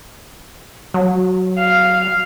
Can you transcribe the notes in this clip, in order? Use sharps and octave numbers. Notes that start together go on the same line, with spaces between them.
F#3
F5